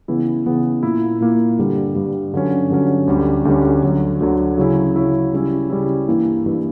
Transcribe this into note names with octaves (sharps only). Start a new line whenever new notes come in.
C#3 E3 B3 E4
C#3 E3 B3 E4
A#2 A#3 E4
A#2 A#3 E4
G2 D3 G3
G2 D3 G3
G2 D3 F#3 C#4
G2 D3 F#3 C#4
D2 D3 G3 C#4
D2 D3 G3 C#4
D2 D3 F#3
D2 D3 F#3
C#3 F#3 C#4 E4
C#3 F#3 C#4 E4
C#3 G3 C#4 E4
C#3 G3 C#4 E4
G2 E3 A#3 E4
G2 E3 A#3 E4